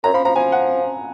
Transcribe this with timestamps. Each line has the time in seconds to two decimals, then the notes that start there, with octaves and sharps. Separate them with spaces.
0.03 F#2 A#5
0.14 F3 B5
0.25 F3 A#5
0.35 F3 G#5
0.52 F#5